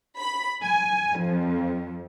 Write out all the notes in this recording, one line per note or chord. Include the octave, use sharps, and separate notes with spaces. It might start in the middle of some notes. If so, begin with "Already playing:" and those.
B5
G#5
F2